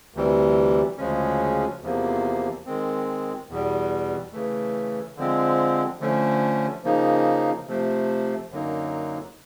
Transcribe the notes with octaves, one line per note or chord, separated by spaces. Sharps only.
D2 C3 E3 G3
D2 C#3 F3 G#3 C#4
E2 C3 F3 A#3
D#3 G#3 C4
E2 B2 G3
C#3 E3 A3
D3 F3 G#3 C4
D3 F3 A3 C#4
C#3 F3 A#3 D#4
C3 F3 A3
F#2 D3 F#3 A#3 D#4